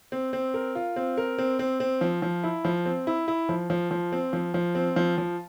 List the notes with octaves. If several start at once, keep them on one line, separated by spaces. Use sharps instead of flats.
C4
C4
A#4
F4
C4
A#4
C4
C4
C4
F3
F3
E4
F3
C4
E4
E4
F3
F3
F3
C4
F3
F3
C4
F3
F3